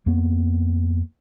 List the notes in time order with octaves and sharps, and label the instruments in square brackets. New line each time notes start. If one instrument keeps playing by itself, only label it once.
[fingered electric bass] F2 A#3 B3